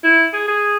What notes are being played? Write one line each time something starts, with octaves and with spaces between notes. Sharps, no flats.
E4
G#4
G#4